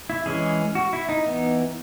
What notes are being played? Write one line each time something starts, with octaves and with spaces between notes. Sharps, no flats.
E4
E3 G#3 C#4 G#4
F#4
E4
D#4
E3 B3